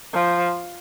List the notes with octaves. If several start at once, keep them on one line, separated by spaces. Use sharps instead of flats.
F3